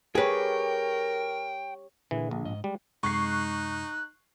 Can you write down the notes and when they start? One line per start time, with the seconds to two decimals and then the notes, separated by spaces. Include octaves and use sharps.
0.15 G4 G#4 A#4 B4 C#5 G5
2.11 A#2 D3 E3 G#4
2.31 A#1
2.45 G#2 D#5
2.64 G3 G#3
3.03 F#2 C3 G#3 D#4 C#6 F#6 C7